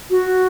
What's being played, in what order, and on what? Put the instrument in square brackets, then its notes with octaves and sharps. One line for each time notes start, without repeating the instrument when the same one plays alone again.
[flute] F#4